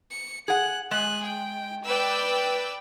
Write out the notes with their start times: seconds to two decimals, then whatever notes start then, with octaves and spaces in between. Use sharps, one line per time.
0.10 C#7
0.48 G#4 F#5 F#6
0.91 G#3 G#4 F#6
1.23 G5
1.84 B4 D5 G5 E6